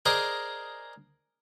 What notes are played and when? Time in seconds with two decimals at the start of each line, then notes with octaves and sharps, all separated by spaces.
0.06 G#4 A#4 C5 D5 D#5 G#5